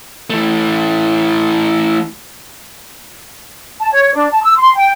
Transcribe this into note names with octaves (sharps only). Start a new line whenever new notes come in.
E3 A3
A5
C#5
D4
A5
E6
C6
G5